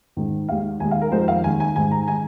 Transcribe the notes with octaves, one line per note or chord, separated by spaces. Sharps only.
G#2 D#3 G#3
D#2 D#3 G#3 F5
D#2 D#3 G#3 G#5
F5
A#4
F2 D#3 G#3 C5
F5
D#2 D#3 G#3 G#5
G#5
G#2 D#3 G#3 G#5
A#5
D#3 G#3 G#5